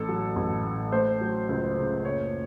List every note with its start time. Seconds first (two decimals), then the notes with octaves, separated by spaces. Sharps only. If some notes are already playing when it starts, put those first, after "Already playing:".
Already playing: A1 A4
0.09 F#3
0.36 A1
0.64 A2
0.92 A3 C5
1.21 F#3
1.49 C#2
1.77 C#3
2.05 F#1 C#5